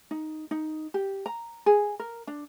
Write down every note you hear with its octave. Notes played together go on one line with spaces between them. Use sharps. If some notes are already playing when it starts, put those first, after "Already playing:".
D#4
D#4
G4
A#5
G#4
A#4
D4